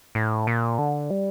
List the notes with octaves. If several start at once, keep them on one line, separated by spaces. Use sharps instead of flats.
A2
A#2
D3
G3